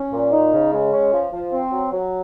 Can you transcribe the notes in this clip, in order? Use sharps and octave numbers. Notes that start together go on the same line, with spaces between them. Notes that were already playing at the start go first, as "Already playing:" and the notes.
Already playing: C#4
A#2
D#4
C#3
G#3
C#4
F3
F3
C4
F#3
F#3